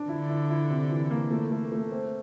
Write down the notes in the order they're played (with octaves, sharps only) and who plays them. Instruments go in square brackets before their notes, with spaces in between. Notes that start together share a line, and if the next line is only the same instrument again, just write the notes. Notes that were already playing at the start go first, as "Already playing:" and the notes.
Already playing: [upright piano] D4
[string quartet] D3 [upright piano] E4
[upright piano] E4
E4
C3
E3
A#3
A3
A3
A3
C4